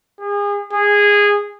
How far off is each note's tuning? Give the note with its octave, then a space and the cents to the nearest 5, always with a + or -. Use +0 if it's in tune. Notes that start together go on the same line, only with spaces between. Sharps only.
G#4 -35
G#4 -15